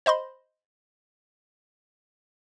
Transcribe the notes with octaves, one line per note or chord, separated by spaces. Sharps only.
C5 D#5 B5 C6